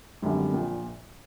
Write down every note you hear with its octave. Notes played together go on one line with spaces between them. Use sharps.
G#1 F#2 D3 G3
A#1 A#2 F3